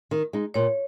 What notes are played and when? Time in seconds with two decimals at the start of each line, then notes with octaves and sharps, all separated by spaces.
0.11 D#3
0.33 G#3 D#4
0.54 A#2 C#5